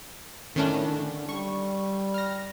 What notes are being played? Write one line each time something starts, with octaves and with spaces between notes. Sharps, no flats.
A2 D#3 C#4 D4
D3
G3 C#6
F6 A#6